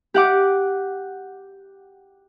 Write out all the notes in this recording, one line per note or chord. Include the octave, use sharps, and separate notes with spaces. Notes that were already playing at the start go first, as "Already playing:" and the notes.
G4 F#5 D6